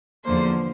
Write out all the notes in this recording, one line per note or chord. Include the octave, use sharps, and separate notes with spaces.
E2 D3 F3 A#3 C5